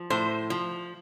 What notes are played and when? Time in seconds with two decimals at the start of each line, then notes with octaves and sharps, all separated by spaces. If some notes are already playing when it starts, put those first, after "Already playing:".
Already playing: F3
0.10 A2 C5
0.50 F3